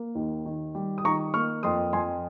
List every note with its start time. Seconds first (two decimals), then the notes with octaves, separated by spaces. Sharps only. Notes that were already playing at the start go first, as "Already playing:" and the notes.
Already playing: A#3
0.15 D#2
0.45 D#3
0.75 G3
0.98 D#6
1.04 D#3 A#5 C#6
1.34 A#3 C#6 F6
1.63 F2 C6 D#6
1.93 F2 G#5 C6